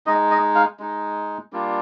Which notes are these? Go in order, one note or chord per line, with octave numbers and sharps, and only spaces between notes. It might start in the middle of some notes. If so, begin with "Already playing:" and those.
G#3 D#4 D#5
D#5
F5
G#3 D#4
G3 A#3 D4 F4